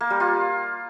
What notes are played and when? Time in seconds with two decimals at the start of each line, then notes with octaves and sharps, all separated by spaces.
0.01 A#3
0.10 G3
0.20 F4